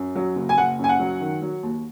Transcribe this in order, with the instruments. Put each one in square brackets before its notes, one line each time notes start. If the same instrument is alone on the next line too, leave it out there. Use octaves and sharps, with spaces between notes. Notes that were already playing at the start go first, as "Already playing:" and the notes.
Already playing: [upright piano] F#2
F#3
F#1
G#5
F#1 F#5
F#2 G#5
F#5
F#3
D#3
F#3
D#2